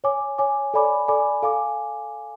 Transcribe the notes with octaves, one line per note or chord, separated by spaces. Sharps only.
C#5 G#5 D6
C#5 G#5 D6
A4 D5 G#5 B5 D6
A4 D5 G#5 B5 D6
A4 F5 G#5 D6